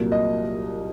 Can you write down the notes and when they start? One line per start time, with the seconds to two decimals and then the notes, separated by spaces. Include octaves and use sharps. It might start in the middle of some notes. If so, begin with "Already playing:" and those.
Already playing: C2 A#2 F#3 A#3
0.12 D#5